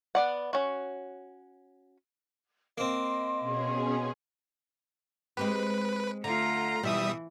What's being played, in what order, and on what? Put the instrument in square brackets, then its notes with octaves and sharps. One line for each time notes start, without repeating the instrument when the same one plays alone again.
[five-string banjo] B3 D5 F#5
C#4 F#4
[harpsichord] A#3 C4 [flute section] D#5 C6
[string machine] B2 C#4 G#4
[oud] G#3 C4 G4 [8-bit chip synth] B4
[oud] D3 [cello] A3 F4 [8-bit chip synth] A#5
[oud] B2 [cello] E3 [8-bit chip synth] G3 E5 D#6